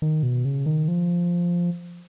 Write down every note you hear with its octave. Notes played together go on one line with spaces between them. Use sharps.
D#3
B2
C#3
D#3
F3